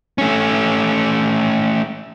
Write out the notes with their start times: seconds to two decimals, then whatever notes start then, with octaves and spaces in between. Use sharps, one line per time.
0.18 A3 C#4